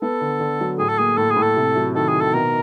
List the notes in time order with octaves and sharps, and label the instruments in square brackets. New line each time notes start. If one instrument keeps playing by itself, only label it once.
[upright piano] B3 [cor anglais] A4
[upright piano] D3
D3
F#3
[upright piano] A2 [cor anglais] G#4
[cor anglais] A4
[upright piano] A#3 [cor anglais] G#4
[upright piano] A2 [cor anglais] A4
[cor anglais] G#4
[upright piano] A2
[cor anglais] A4
[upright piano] C3
F#3
[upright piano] D#3 [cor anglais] A4
[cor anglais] G#4
[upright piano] D#3
[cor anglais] A4
[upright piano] B2 [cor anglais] A#4